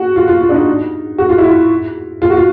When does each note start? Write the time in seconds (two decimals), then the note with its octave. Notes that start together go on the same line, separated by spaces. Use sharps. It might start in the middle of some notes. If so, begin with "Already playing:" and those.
Already playing: F#4
0.16 F4
0.28 F4
0.42 F4
0.49 D4
0.54 D#4
1.18 F#4
1.29 F4
1.38 E4
1.48 F4
2.22 F4
2.30 F#4
2.37 F4